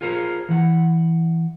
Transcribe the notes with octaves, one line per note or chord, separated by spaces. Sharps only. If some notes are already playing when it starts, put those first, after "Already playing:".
F4 G#4 A#4 C5
E3 F#5